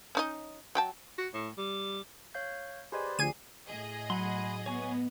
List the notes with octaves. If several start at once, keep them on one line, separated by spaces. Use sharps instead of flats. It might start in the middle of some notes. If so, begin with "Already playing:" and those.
C#4 D#4 D#5
F#3 G5 A5
F#4
A2
G3
C#5 F5 G6
G4 G#4 B4 C5 D5 D#5 G#5
D2 F3 G#4 G#5 C7 D#7
A2 G#4 D#5
F#3 F#5 B5 C6
B3 C#5 G#5 C#6